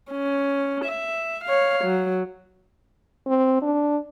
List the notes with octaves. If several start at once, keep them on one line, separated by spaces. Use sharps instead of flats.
C#4
E5
C#5 F5
F#3
C4
D4